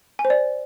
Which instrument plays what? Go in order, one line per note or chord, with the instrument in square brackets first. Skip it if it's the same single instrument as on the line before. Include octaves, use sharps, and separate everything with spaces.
[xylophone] G#5
C5
D5